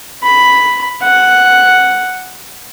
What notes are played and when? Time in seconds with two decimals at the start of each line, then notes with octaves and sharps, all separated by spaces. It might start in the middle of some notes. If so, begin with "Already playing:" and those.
0.23 B5
1.02 F#5